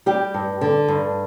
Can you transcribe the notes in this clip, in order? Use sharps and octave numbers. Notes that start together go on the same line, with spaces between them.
G3 G4
G2
D3
G2